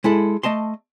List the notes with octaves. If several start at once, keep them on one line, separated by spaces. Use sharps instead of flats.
G#3 E4 A4
A3 D#5 A5 C6